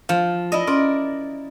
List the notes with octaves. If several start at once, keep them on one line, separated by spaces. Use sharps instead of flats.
F3 F5
E4 D5 D#5
C#4 A#4 D5 C6